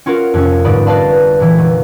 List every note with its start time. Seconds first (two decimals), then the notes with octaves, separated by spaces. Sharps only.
0.06 C#4 F4 F#4 A#4
0.34 F2 C3 C#4
0.64 G1 G#2 D5 B5 D#6
0.86 B4 D5 D#5 F5 A5 B5
1.40 A#2 E3
1.58 F1